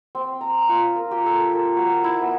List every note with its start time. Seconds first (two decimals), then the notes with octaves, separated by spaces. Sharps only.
0.15 C4
0.41 A#5
0.69 F4
0.96 A#4
1.11 G4
1.26 A4
1.53 A#4
1.77 F#4
2.04 E4
2.22 B3